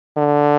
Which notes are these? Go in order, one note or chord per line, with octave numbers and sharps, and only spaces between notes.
D3